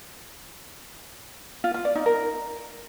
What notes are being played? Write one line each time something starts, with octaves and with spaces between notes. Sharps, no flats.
F4
F4
D5
D#4
A#4